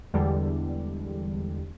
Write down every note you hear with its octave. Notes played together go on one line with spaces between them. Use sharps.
E2 D3 G3 G#3